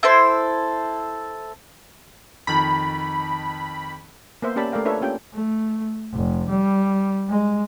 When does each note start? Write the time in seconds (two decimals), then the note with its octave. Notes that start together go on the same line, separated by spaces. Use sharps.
0.03 E4 A4 C5
2.47 F2 D#3 B5
4.42 A#3 B3 C5 E5
4.56 A#3 C#4 G4 D5 A5 B5
4.72 A3 A#4 D5 F5 G5
4.85 D4 F4 A4 B4 C#5 E5
5.02 A#3 C#4 F4 G4 G5
5.34 A3
6.13 F1
6.48 G3
7.29 G#3